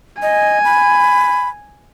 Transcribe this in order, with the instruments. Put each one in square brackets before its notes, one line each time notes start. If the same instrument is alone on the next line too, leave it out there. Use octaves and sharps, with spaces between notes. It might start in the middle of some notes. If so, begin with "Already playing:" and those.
[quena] D#5 [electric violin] G#5
[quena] B5